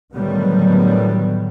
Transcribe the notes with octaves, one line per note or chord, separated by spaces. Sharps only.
A2 D3 D#3 F#3 G3 B3